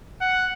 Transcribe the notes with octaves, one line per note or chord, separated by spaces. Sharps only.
F#5